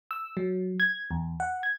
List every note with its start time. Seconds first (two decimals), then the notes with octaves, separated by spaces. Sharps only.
0.11 E6
0.37 F#3
0.80 G#6
1.11 E2
1.40 F#5
1.63 G#6